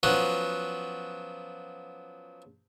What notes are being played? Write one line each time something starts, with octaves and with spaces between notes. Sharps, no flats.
F3 F#3 B3 C#4